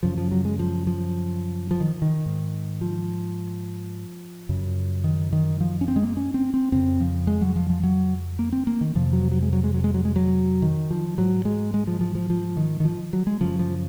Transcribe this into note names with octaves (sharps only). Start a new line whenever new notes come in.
F#2 C#3 F3
F3
F#3
G#3
F3
F3
F3
D#3
D#3
G#2
F3
F#2 C#3
D#3
D#3
F3
C#4
C4
G#3
A#3
C#4
C4
C4
F2 C#3 C4
F3
G#3
F#3
F3
F3
F#3
A#3
C4
A#3
D#3
F2 C3 F3
F#3
F#3
G#3
F#3
G#3
F#3
G#3
F#3
G#3
F#3
D#3
F3
G#2 F#3
G#3
G#3
F3
F3
F3
F3
D#3
D#3
F3
F#3
G#3
F#2 C#3 F3
F3